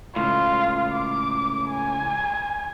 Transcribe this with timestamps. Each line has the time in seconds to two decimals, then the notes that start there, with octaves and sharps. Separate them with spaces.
0.16 C#2 A2 F4
0.93 D6
1.69 G#5